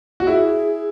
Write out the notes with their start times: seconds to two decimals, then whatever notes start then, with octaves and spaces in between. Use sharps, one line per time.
0.20 F#4
0.27 E4 G#4